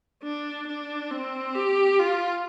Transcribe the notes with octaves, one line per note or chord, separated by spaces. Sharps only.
D4
D4
C4
G4
F4